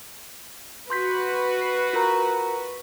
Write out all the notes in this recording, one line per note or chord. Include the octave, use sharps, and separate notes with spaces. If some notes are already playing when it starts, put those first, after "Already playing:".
F#4 B4 C6 G6 B6
C7
F4 A#4 A#5